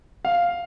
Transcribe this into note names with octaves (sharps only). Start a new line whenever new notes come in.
F5